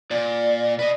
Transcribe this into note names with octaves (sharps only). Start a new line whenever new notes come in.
A#2 D5
B4 D#5